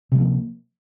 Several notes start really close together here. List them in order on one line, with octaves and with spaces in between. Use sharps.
C3 G3 F3 A#3